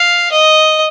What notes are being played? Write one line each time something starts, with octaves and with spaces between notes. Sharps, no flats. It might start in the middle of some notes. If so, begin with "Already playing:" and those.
Already playing: F5
D#5